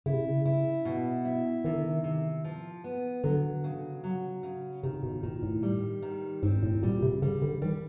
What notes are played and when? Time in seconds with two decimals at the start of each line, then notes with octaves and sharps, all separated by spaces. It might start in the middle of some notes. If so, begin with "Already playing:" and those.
0.06 C#3 E4
0.13 C3
0.21 C#3
0.45 E4
0.85 B2
1.25 E4
1.65 C3 D#3
1.73 D3
1.83 D#3
2.04 C3
2.44 F3
2.84 B3
3.24 D3 F#3
3.64 C#3
4.04 F#3
4.43 C#3
4.83 C3 D#3
5.03 B2
5.23 A#2 D#3
5.43 A2
5.63 G3
6.03 D#3
6.43 G#2 C4
6.63 A2
6.83 A#2 G3
7.03 C3
7.22 C#3 G3
7.42 D3
7.62 D#3 G3